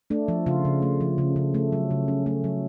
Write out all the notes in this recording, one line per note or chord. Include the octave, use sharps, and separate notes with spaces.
A3 D4
F3
C#3 F4
C#3
A3
F3
C#3
C#3
A3
F#3
C#3
C#4
A3
F#3